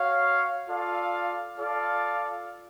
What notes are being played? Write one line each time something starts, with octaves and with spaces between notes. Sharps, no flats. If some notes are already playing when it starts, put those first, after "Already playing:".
Already playing: F#4 C#5 F5
F4 A4 D5 F5
F4 A4 D5 F5